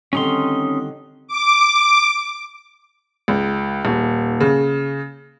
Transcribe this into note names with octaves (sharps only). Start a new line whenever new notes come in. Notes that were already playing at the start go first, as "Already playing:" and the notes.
D3 D#3 G3 C4 C#4 D#4 C6
D6
C#2
D#1
C#3